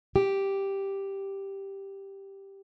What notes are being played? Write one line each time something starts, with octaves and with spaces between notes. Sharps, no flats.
G4